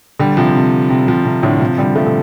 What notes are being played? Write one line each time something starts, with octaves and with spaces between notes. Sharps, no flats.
D3 G3
C3 F3
C3
C3
C3 F3
C3
A2 D3
C3 F3
D3 G3
F3 A3
D3